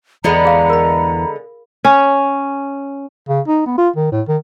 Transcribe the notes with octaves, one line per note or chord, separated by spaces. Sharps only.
E2 D3 E3 G#3 B3 A#5
G#4 F5 A5
A#4 B5
C#4
C#3
D#4
B3
F4
D#3
A2
D#3